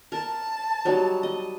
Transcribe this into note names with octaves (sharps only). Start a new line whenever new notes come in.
A#4 A5
F#3 G3 D#4
D#5